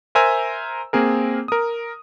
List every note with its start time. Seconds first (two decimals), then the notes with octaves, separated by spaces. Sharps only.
0.15 A#4 C5 E5 G#5 A#5 E6
0.93 A#3 C4 G#4 A#4
1.48 A#4 D#6